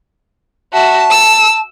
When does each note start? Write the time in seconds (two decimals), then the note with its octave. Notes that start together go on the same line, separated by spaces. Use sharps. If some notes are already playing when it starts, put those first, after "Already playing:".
0.73 F#4 E5 A5
1.11 E6